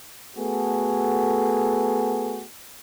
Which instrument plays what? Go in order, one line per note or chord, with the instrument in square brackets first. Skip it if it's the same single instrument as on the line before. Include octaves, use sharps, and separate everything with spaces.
[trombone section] A3 B3 F#4 G#4 A4